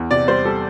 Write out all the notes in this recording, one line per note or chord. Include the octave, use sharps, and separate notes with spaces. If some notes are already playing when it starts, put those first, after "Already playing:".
Already playing: E2
C3 D5
G3 C5
G3 A4